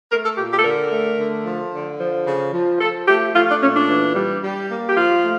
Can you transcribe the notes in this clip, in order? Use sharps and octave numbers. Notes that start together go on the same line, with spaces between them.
A3 A#4
A4
A#2 G4
G4
A4
D3 A#4
A3
D3
F3
D3
F3
C#3
F3
F3 A4
A3 G4
A3 F4
D4
A#2 C#4
D4
E3
G3
G3
A#3
G4
F3 F4
A3